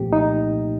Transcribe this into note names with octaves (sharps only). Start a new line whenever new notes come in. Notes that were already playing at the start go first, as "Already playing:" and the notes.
Already playing: C2 A#2 F3 A3 C4 G4
D#4